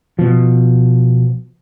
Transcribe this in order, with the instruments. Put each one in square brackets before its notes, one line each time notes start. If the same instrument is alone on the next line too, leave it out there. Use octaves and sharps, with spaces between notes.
[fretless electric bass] B2 F3